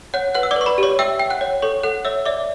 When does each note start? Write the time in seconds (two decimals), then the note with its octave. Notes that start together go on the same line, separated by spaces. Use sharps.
0.14 C#5 F#5 F#6
0.34 B4 F#5 F#6
0.43 E6
0.51 D5 D6
0.56 B4
0.61 C#6
0.66 B4 B5
0.78 G4 C#5 C#6
0.99 E5 G5 E6
1.20 G5
1.30 F#5 F#6
1.41 C#5
1.62 A4 C#5 C#6
1.83 A4 F#5 F#6
2.05 C#5 E5 E6
2.26 D5 E5 D6